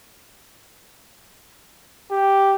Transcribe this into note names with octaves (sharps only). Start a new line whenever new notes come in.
G4